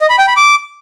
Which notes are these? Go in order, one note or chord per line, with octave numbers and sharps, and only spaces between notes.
D#5
B5
G5
B5
D6